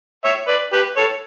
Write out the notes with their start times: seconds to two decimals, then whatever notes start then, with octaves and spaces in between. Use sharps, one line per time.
0.24 C#5 E5
0.48 B4 D5
0.72 G4 B4
0.97 A4 C#5